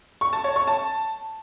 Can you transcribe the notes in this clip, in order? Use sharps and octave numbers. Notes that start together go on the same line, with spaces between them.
C#6
A5
C#5
C#6
A5